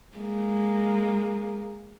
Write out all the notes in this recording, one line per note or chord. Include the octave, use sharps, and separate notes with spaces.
G#3 A#3